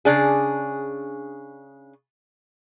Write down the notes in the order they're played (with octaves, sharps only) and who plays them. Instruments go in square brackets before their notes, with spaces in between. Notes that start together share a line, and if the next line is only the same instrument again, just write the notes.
[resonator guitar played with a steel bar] C#3 D4 G#4